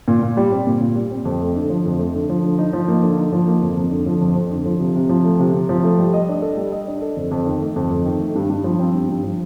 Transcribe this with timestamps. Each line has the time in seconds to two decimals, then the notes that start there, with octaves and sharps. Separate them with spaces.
0.08 A#2
0.22 A#2
0.37 G3
0.52 C4
0.67 A#2
0.81 A#2
0.95 G3
1.11 C4
1.25 F2
1.40 A3
1.55 D3
1.70 F3
1.85 F2
1.99 A3
2.14 D3
2.29 F3
2.44 D3
2.59 D#4
2.73 F3
2.88 A#3
3.03 D3
3.17 D#4
3.33 F3
3.48 A#3
3.61 F2
3.77 F2
3.91 D3
4.06 F3
4.21 F2
4.36 F2
4.51 D3
4.66 F3
4.80 C3
4.96 C3
5.09 F3
5.25 A3
5.39 C3
5.53 C3
5.69 F3
5.84 A3
5.99 G3
6.13 D#5
6.28 D4
6.42 A4
6.57 G3
6.72 D#5
6.87 D4
7.02 A4
7.17 F2
7.31 F2
7.46 D#3
7.61 A3
7.76 F2
7.91 F2
8.05 D#3
8.20 A3
8.35 G2
8.50 G2
8.64 F3
8.79 C4
8.94 G2
9.09 G2
9.23 F3